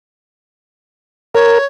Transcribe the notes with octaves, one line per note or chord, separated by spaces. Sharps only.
A#4 C#5